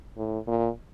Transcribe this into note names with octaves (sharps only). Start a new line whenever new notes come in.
A2
A#2